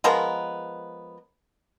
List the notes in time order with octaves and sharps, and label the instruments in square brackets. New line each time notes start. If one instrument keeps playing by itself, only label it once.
[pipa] F3 G#3 B3 A#4